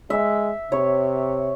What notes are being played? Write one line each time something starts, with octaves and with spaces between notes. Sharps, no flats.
G#3 E5
C3 C#5